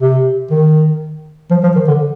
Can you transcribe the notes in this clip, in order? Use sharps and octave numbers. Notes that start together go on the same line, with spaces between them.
C3
D#3
F3
F3
D#3
D3